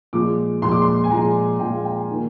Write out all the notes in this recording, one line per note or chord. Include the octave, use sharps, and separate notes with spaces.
A#2 F3 G#3 D6
A#2 F3 G#3 C6
D6
C6
G#5
A#2 F3 G#3 A#5
A#2 F3 G#3 G5
F5
G5
D#3 A#3